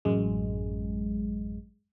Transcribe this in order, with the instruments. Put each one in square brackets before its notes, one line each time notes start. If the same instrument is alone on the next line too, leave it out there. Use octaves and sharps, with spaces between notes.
[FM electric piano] A1 F#2 G#3